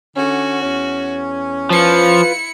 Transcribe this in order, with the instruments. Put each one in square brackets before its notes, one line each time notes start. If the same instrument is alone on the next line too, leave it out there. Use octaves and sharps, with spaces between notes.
[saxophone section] D3 C#4 [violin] F#4
[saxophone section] E2 C#4
[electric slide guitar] F3 [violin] E4 C#7 [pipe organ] F4 B4